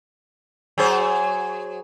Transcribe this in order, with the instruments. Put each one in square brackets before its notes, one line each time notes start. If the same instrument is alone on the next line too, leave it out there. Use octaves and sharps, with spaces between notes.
[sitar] F#3 G#4 C5